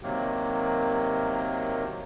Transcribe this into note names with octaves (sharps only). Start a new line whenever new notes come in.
C3 D#3 F#3 A#3